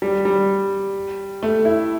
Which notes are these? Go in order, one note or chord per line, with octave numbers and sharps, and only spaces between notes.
G3
G3
A3
E4